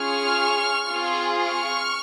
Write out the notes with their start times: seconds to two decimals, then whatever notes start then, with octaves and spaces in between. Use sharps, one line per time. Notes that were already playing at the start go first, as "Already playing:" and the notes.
Already playing: C#4 F4 G#4 C#6 F6
0.90 C4 F4 G#4
1.42 C#6 F6